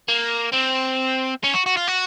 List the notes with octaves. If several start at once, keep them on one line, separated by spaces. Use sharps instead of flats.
A#3
C4
C#4
F#4
F#4
F4
F#4